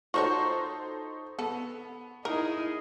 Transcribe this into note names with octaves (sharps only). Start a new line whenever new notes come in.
D#4 F4 F#4 A4 C5 C#5 C#6
B3 A4
D#4 E4 G#4 A#4